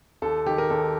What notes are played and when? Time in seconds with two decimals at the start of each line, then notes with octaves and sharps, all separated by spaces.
0.22 D#2 A4
0.46 D#3 G4
0.58 A#4
0.70 D#2 A4